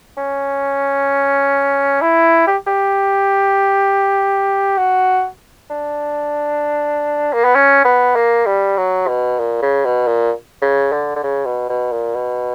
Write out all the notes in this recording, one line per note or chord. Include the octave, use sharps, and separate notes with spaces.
C#4
E4
G4
G4
F#4
D4
A#3
B3
C#4
B3
A#3
G3
F#3
B2
A#2
C#3
B2
A#2
C#3
D3
D3
C#3
B2
B2
A#2
B2